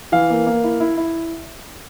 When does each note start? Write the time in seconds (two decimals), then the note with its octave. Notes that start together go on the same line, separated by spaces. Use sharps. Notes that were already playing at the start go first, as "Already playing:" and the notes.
0.12 E3 F5
0.30 A#3
0.47 A#3
0.63 E4
0.80 E4
0.97 E4